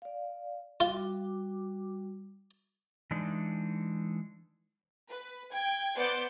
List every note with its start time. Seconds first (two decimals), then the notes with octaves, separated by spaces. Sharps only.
0.02 D5 F5
0.80 G3 F4 F#4 D6
3.11 E3 G#3 D4 D#4
5.09 B4
5.53 G5 G#6
5.95 B3 C5 D5 D6 G6